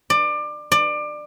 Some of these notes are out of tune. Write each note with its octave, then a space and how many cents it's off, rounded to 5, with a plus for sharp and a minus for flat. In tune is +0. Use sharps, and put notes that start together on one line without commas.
D5 +25
D5 +25